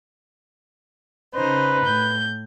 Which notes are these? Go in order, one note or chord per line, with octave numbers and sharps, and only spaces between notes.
C#3 D#4 B4 C5
A2 G6